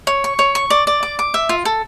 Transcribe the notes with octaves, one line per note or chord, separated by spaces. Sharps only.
C#5
C#6
C#5
C#6
D5
D5
D6
D6
E5
F4
A4